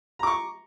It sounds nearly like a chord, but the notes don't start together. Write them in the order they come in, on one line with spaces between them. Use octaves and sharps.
A#5 D6 C#6